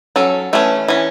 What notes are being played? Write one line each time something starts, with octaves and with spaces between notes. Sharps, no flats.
F#3 C#4 A4
E3 A3 C#4
E3 C#4